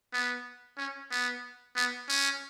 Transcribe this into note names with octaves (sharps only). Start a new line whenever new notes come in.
B3
C#4
B3
B3
C#4